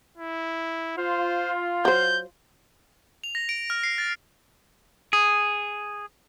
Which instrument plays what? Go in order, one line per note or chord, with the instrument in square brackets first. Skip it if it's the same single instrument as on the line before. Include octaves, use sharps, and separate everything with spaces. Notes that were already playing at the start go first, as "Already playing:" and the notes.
[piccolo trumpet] E4
[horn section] F4 [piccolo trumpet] C5
[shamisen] F#3 C5 [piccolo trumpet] G6
[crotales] F7
A#6
D7
F6
C7
A6
[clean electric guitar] G#4